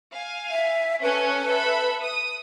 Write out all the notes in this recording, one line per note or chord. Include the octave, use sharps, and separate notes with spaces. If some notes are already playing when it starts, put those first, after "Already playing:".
F5 G#5
E5
C#4 A4 B4 G#5
A4 E5 B5
D#6